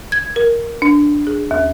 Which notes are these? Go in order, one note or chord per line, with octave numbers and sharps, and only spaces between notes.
G#6
A#4
D4
G#4
D#2